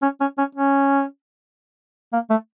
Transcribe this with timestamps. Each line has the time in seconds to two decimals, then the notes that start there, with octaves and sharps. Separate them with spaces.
0.02 C#4
0.20 C#4
0.38 C#4
0.55 C#4
2.13 A#3
2.30 A3